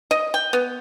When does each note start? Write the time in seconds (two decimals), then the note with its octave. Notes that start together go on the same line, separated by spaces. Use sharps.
0.11 D#5
0.34 G5
0.53 B3